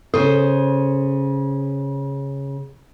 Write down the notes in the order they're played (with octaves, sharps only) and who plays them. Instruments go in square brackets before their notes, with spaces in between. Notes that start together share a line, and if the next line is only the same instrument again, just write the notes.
[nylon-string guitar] C#3 C5 [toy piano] A4